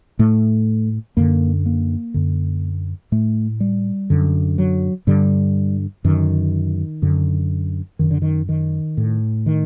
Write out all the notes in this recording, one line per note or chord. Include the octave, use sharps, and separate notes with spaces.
A2 A3
F#2 D3 A#3
A#3
F#2 D3
A2 A3
G3
F#2 D3
F#3
G2 D3 G3
F#2 D3 D#3
F#2 D3
F#2 D3 D#3
D3
D#3
D#3
A2
D#3